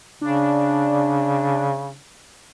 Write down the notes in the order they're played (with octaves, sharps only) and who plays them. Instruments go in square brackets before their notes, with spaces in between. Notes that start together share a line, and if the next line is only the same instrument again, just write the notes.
[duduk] C#3 [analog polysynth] D4